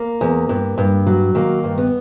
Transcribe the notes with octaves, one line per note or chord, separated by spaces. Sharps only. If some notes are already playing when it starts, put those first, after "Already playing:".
Already playing: A#3
E2
G2
G2
F#3
D#3 A#3
G2
B3